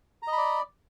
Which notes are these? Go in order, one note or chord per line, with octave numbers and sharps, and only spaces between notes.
D5 D#5 A#5 B5